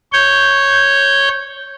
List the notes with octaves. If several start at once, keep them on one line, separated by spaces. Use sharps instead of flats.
C#5 G6